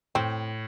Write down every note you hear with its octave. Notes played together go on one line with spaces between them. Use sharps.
A2 C4